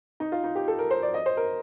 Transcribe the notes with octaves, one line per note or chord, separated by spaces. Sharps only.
D#4
F4
D#4
G4
A4
A#4
C5
D5
D#5
C5
A#4